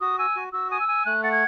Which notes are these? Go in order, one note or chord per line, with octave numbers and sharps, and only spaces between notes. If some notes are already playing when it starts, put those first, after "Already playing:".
F#4 D#6
G#5 E6
F#4
F#4 E6
G#5 D#6
E6
G#5
A3 F#6
F#5 A6
G#6